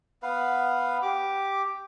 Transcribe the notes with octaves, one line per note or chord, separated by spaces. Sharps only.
B3 B4 F5
G4 D6